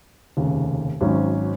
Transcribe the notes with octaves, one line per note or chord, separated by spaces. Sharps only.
F1 D#2 C#3
G#1 G#2 F#3 C#4